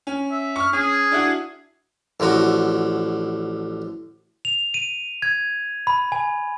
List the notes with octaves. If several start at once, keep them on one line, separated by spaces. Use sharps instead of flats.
C#4
E5
C#6 F6
C#4 G#4
D4 E4 F#4
A1 D3 F3 F#4
F7
D#7
G#6
B5
G#5